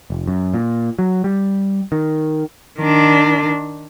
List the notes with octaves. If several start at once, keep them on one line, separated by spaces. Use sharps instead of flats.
F1
F#2
A#2
F#3
G3
D#3
D#3 D4